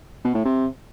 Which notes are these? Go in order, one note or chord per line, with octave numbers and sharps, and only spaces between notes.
B2
A2
C3